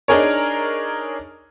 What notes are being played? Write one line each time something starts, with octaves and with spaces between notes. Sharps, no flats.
D4 D#4 G#4 A#4 C#5